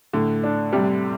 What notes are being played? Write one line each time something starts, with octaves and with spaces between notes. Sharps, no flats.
A2 D3
D4
C3 G3